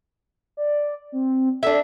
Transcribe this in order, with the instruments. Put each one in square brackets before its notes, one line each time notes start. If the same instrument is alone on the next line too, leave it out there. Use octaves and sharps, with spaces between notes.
[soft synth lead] D5
C4
[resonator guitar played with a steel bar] D4 E5 [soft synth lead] A4